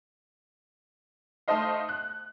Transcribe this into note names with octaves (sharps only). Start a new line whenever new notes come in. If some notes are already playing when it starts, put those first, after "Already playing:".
A3 D#4 A4 C5 D#5 F5
F#6